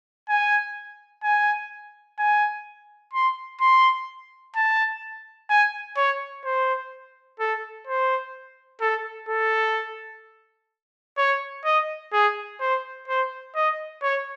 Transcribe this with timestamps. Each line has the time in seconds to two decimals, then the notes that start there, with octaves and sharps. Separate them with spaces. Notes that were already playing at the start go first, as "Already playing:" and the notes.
0.29 G#5
1.23 G#5
2.19 G#5
3.13 C6
3.61 C6
4.56 A5
5.50 G#5
5.97 C#5
6.45 C5
7.40 A4
7.87 C5
8.81 A4
9.29 A4
11.18 C#5
11.65 D#5
12.13 G#4
12.60 C5
13.08 C5
13.55 D#5
14.02 C#5